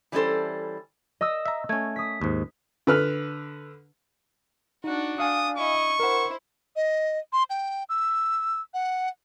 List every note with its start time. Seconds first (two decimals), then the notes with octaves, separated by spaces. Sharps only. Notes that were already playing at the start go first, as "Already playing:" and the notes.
0.12 E3 G3 C#4 D#4 A4 C5
1.21 D#5 D#6 E6
1.46 E5 A#5
1.69 A3 C#4 G#6
1.96 D#6 B6
2.22 D#2 G#2
2.87 D3 B4 F6
4.84 D4 D#4 F#4
5.20 D4 F5 G#5 D#6
5.57 E4 D#5 C#6
6.00 E4 A#4 C5 F#5
6.76 D#5
7.33 C6
7.50 G5
7.89 E6
8.74 F#5